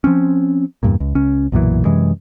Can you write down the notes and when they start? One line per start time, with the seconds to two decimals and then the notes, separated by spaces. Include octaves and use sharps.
0.04 F3 C4 C#4
0.83 E2 G2 A#2
1.00 C#2
1.15 C#2 C#4
1.52 B1 F#2 A#2 E3
1.85 F#2 C3 E3 G#3